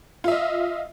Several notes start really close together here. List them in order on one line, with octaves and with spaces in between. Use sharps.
F4 E5 D#5